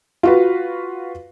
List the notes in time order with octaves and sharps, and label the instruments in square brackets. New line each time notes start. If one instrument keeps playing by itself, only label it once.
[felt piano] F4 F#4 B4